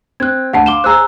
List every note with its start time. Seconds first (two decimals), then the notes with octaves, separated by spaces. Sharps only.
0.20 C4 F#6 G#6
0.53 D2 F#5 A5 C7
0.66 F5 C6 D6 E7 G7
0.84 G#4 C5 A#5 E6 F#6